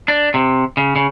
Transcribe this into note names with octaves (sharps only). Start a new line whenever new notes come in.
D4
C3
C#3
C#3